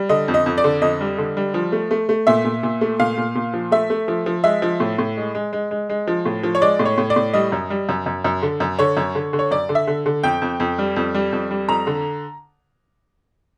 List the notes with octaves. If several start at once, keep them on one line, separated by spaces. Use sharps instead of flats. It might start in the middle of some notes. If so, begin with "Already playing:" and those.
Already playing: G3
D3 D#5
F2
D#5
F2
D5
D3
F2 D#5
G3
D3
G3
F3
A3
A3
A3
A#2 E5
A#2
A#2
A3
A#2 F5
A#2
A#2
F3
A3 E5
A3
F3
F3
G#3 E5
F3
A2
A2
G#3
G#3
G#3
G#3
G#3
F3
A2
F3
C#5
G#3 D5
A2
C#5
A2
D5
A2
G3 D#5
F#2
G3
F#2
F#2
F#2
D3
F#2
D3 C#5
F#2
D3
D3
C#5
F#2 D5
D3
E5
D3
D3
F2 G5
F2
F2
G3
F2
G3
F2
G3
F2 A#5
D3